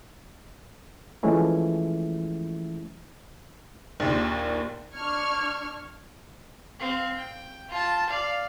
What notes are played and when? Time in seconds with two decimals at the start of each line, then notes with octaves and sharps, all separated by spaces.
1.23 E3 F3 G#3 A3 C#4 E4
4.00 A#1 D#2 A#2
4.95 D4 C#6 F6 G#6
6.79 C4 F5
7.17 G5
7.70 F4 A5
8.09 D5 F5